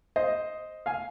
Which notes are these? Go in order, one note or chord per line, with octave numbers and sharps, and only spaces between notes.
C5 D#5
F5 G#5